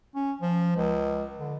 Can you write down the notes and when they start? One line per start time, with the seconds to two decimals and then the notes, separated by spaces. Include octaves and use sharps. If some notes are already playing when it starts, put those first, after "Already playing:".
0.15 C#4
0.41 F3
0.77 C#2
1.39 D3